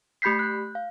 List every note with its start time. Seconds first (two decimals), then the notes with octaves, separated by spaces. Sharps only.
0.22 A3 G4 B5 G6 B6 C7
0.39 F#6 G6
0.75 F5